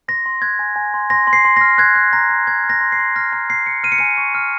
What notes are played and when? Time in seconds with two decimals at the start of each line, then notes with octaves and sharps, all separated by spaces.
0.08 C6 A#6
0.26 C6
0.42 F#6 G#6
0.59 G#5
0.76 G#5
0.94 C6
1.10 C6 A#6
1.27 C6
1.33 C7
1.45 C6
1.57 F6 A#6
1.78 F#6 G#6
1.95 F#6
2.13 A#5 A#6
2.29 A#5
2.47 C6 G#6
2.64 F6
2.70 A#6
2.81 C6
2.92 C7
2.99 C6
3.16 F6 A#6
3.32 A#5 A#6
3.49 F6 C7
3.66 F6 C#7
3.83 F6 D#7
3.92 C#7
3.98 G#5 D#7
4.18 C#6
4.35 F6